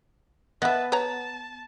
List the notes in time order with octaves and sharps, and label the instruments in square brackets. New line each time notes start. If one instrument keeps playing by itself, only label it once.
[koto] B3 [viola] B4 A5 [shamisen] D#5 E5
[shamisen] B4 C#5 A#5 [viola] A5